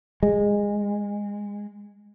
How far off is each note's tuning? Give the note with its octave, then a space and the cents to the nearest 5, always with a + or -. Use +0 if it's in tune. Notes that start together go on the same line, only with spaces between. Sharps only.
G#3 -20